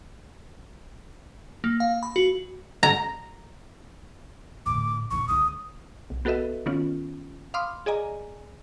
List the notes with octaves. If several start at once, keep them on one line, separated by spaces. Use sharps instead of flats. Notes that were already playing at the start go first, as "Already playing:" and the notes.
A#3
F5
B5
F#4
A#5
A2 D3 D6
A#2 C#3 C#6
C#2 D3 D#6
B1
B3 F#4 A4 B4 D#5 E5
D#3 B3 C#4 F4
F5 B5 C6 D6 D#6 F6
G#4 D5 D#5 G#5 A#5